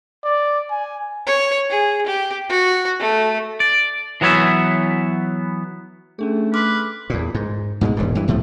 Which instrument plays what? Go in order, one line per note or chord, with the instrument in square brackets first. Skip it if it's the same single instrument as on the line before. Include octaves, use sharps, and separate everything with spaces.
[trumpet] D5
G#5
[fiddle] C#5
G#4
G4
F#4
A3
[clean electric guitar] D5
E3 F#3 B3 C#5 E5
[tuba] A3 [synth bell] C#4 D4 G#4
[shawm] B4 [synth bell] C6 F6 [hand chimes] D6
[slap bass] E2 A#2
G#2
G#2 B2 F3 G#3
E1 G2 A#2
G2 E3
C2 A2 F3 A3